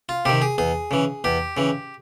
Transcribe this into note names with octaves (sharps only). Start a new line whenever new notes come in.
F4
C3 D#3 G4
G#4
E2 G#4
C#3 E3
E2 G4
C#3 E3